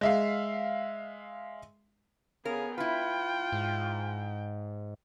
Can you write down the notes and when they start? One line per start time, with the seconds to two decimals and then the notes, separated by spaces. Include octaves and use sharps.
0.01 G#3 E5 F5
2.45 C#3 B3 G#4 A#4
2.78 E4 F4 B4 G5
3.52 G#2